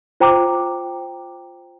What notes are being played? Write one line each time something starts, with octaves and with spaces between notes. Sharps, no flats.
F4 C5 G5 A#5 D6